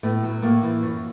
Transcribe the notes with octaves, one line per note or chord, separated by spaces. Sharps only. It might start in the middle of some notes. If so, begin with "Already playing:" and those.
A2 B3
F#3
A2 A#3
E3
F#2